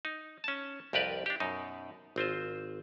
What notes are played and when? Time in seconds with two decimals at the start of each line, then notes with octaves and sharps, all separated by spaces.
0.05 D#4
0.44 C#4 A5
0.93 C2 F2 G4 A#4 B4 D5
1.26 D4 G4
1.40 F#2 B2 D#4
2.16 G#1 C4 F4 C5